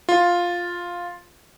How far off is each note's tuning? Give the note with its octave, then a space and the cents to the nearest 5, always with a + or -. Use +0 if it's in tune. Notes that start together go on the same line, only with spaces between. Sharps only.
F4 +5